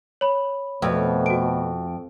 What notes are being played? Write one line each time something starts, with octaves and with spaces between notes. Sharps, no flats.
C#5 B5
F2 B2 A3
F#4 D7